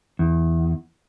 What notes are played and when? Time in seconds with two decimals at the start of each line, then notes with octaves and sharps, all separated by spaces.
0.19 E2